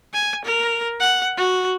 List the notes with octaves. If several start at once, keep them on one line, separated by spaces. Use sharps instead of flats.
G#5
A#4
F#5
F#4